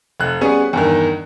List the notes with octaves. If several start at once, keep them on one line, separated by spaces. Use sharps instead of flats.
F1 F#6
G3 B3 C#4 G#4
E2 G2 D#3